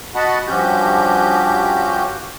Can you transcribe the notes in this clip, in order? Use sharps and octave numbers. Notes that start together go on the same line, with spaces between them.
F#4 D#5 F#5 A5 B5
G2 F3 C#4 F#4 G4 G6